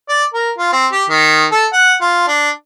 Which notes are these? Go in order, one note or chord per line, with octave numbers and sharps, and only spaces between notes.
D5
A#4
F4
C4
G4
D#3
A4
F#5
F4
D4